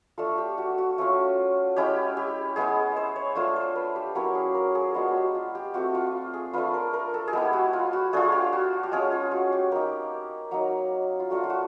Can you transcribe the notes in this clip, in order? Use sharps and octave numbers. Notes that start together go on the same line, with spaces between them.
A3 D4 F4 A4
G4
F#4
F#4
A3 C#4 F4
G#3 C#4 E4 G4
G4
G#3 B3 E4 G#4
C5
C#5
A3 D4 F4 C5
C5
B4
G4
F#3 A#3 C#4 E4 G4
G#4
A#4
G#4
G#3 B3 D4 F4 F#4
G4
F#4
F4
G4
A3 C4 F4 F#4
F4
G#4
A3 D4 F4 B4
A#4
A#4
A4
G#4
G#3 B3 E4 G4
F#4
F4
F#4
A3 D4 F4 G#4
G4
F#4
G4
G#3 C#4 F4 G#4
F4
F#4
G4
A#3 D#4 G4
F#3 A#3 D#4
F4
A3 D4 F4 F#4
F4
F#4